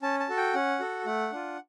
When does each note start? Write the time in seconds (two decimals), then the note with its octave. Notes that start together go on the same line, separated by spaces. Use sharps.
0.02 C#4 A5
0.20 A5
0.29 F#4 A4
0.37 G5
0.54 C#4 F#5
0.80 F#4 A4
1.06 A3 F#5
1.32 D4 F4